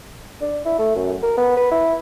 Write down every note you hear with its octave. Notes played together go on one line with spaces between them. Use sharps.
D4
E4
A3
F#2
A#4
B3
B4
E4